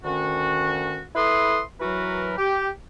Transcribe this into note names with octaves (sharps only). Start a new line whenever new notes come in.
D2 D#3 C#4 F#4
E4 A4 B4 C6 D#6
E3 F#3 F#4 A#4 B4
G4